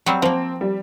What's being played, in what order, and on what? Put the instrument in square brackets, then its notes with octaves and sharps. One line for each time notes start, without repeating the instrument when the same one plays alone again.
[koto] F#3 G3 C4
[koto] F3 A#3 [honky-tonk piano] C4
[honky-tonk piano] G3